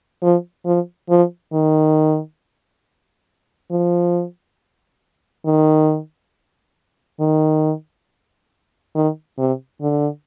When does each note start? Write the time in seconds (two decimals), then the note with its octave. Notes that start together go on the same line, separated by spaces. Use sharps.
0.22 F3
0.66 F3
1.09 F3
1.53 D#3
3.71 F3
5.46 D#3
7.20 D#3
8.95 D#3
9.38 C3
9.81 D3